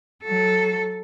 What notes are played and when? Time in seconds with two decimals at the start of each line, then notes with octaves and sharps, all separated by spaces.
0.24 F#3 A4